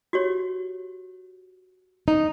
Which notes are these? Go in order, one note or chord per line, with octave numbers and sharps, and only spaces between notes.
F#4 G4 C#5
D#4